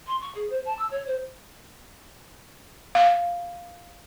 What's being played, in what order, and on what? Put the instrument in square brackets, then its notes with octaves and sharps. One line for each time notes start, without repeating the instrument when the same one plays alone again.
[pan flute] C6
C#6
G#4
C5
A5
E6
C#5
C5
[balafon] F5